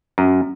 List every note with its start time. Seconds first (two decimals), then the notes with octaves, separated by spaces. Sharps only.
0.18 F#2